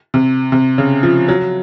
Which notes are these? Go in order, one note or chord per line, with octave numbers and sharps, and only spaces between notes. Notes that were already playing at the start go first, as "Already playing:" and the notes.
C3
C3
C#3
F3
F#3